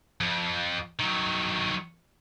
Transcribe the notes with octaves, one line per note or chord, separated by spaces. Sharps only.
F2
D#3 F#3